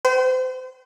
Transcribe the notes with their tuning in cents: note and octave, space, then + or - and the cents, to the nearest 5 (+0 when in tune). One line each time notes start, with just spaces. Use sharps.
C5 -35 G5 -30